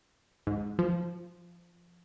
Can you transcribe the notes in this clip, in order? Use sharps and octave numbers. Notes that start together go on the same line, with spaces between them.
G#2
F3